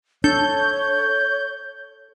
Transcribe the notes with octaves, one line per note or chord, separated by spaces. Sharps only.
D4 A4 C#5 G6